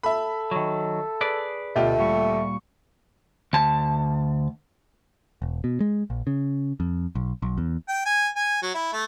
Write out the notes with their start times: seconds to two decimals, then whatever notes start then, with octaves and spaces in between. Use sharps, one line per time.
0.03 A4 E5 B5
0.51 D#3 F#3
1.21 G#4 B4 D5
1.76 D2 B2 A3 F4 G4
1.99 A#2 G3 C#6
3.53 D2 A5
5.42 E1
5.64 B2
5.80 G#3
6.10 A#1
6.27 C#3
6.80 F2
7.15 B1
7.42 B1
7.58 E2
7.88 G5
8.05 G#5
8.36 G#5
8.62 F#3
8.74 E4
8.93 A3